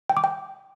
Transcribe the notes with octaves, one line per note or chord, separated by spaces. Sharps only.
G5
D6
G5